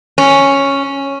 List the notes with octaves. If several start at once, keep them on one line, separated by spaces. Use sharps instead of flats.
C#4